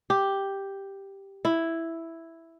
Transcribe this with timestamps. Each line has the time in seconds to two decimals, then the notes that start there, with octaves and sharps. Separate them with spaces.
0.10 G4
1.45 E4